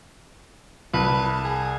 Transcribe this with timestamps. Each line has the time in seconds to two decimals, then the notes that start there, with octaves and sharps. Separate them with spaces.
0.94 C2 B4 A5
1.44 G#4